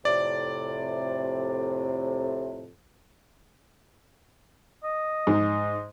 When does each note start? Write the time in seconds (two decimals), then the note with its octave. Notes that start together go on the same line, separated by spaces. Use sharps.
0.05 F2 A2 C3 D5
4.84 D#5
5.27 G#2